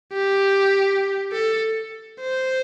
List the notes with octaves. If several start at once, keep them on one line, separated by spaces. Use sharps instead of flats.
G4
A4
C5